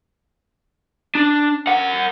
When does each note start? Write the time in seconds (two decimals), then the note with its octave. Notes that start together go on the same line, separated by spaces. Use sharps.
1.15 D4
1.67 A#4 F#5